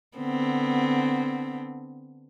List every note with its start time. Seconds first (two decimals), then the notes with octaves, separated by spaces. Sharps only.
0.18 D3 B3 C4